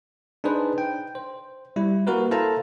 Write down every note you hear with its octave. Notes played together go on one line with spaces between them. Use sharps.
D4 D#4 G#4 B4 C5
G5
C5
G3 E4
A#3 F#4 A#4 B4
E4 A4 C5 F5 A5 A#5